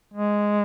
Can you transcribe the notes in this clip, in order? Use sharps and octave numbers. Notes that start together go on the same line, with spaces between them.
G#3